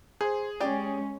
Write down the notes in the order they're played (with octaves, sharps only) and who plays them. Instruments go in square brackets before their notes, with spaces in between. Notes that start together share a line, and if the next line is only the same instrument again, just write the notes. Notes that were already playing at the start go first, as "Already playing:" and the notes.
[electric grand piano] G#4 [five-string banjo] C5
[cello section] G#3 C#4 [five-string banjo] G4 D5